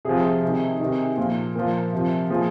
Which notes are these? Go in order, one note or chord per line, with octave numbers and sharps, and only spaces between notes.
C3 F3 G#4
C3 D#3
C3 D#3
A#2 F3
A#2 F3 A#4
C3 F3
A#2 F3 G#4